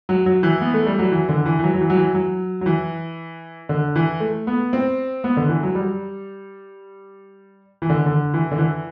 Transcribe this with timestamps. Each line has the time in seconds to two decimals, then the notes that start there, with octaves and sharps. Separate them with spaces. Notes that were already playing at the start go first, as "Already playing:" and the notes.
0.09 F#3
0.26 F#3
0.43 E3
0.61 B3
0.74 A3
0.86 G3
0.99 F#3
1.12 E3
1.29 D3
1.46 E3
1.59 E3
1.64 F#3
1.74 F#3
1.81 E3
1.90 F#3
1.97 E3
2.14 F#3
2.61 F#3
2.66 E3
3.69 D3
3.96 E3
4.20 A3
4.47 B3
4.73 C4
5.24 B3
5.37 D3
5.49 E3
5.63 F#3
5.75 G3
7.82 E3
7.90 D3
8.06 D3
8.34 E3
8.51 D3
8.58 E3